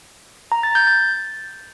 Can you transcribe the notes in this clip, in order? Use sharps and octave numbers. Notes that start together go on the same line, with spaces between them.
A#5
A6
G6
A6